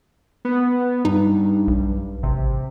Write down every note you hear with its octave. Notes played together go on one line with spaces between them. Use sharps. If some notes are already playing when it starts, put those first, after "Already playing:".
B3
G2 D#4
B1
A1 C3